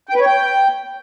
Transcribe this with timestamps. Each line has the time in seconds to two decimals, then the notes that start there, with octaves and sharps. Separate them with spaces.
0.09 G5
0.15 B4
0.20 C#5
0.26 G5